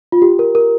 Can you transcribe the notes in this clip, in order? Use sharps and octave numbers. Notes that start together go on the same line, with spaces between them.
F4
G4
A#4
A#4